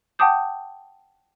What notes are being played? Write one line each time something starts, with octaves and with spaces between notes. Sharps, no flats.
F#5 G5 A5 D6 D#6 G6